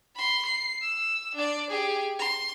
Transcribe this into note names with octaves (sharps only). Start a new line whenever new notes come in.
B5 C6
C7
E6
D4 D5
G4 G#4
C6